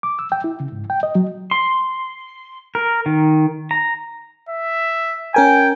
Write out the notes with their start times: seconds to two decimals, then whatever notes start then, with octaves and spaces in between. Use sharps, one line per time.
0.03 D6
0.19 E6
0.32 G5
0.44 E4
0.60 C#3
0.72 G#2
0.90 G5
1.03 D#5
1.15 F#3
1.51 C6
2.75 A#4
3.06 D#3
3.71 A#5
4.49 E5
5.34 C#4 A#4 G5 G#5